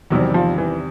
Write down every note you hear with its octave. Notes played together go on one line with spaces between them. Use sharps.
E2 C3 D#3 F#3 G3 C4
F3
E3